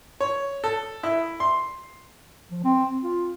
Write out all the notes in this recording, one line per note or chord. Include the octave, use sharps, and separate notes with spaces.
C#5
A4
E4
C6
F3
C4
F4